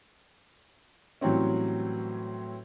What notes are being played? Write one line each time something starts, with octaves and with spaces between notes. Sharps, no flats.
A2 E3 F#3 G3 C4 C#4